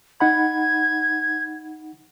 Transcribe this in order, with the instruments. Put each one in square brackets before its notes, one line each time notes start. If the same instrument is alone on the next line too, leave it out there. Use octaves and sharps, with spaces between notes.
[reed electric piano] D#4 F#5 B5 [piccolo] G#6